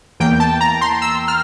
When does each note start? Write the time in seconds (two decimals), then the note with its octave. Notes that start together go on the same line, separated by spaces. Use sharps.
0.20 E2 E3 A#3 G5
0.40 A5
0.61 A#5
0.81 C6
1.02 E6
1.28 F6